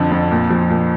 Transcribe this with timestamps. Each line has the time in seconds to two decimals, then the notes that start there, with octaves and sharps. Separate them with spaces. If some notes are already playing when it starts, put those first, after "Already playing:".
Already playing: F2 D3 F3 A5
0.11 F2
0.31 A#2
0.50 F3
0.70 A#2